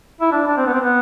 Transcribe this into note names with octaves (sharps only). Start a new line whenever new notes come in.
E4
D4
D4
C4
B3
C4
B3